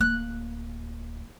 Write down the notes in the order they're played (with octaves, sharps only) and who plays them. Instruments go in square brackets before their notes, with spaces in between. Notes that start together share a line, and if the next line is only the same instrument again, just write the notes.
[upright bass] D1 A#3 [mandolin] F#6